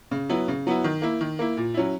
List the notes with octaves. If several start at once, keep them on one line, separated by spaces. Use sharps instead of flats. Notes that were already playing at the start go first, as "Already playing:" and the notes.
C#3
F#3 B3 E4
C#3
F#3 B3 E4
D#3
A#3 E4
D#3
A#3 E4
A#2
F#3 C#4 E4